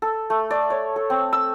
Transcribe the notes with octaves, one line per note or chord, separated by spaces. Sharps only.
A4
A3
D5
C#5
A4
C4
E6